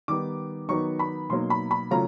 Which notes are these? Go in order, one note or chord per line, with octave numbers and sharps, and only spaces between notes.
D#3 G3 B3 D#4 D6
D#3 F#3 B3 D#4 C#6
B5
B2 F#3 A#3 D#4 C6
B5
B5
C#3 F#3 A3 C#4 F4 A#5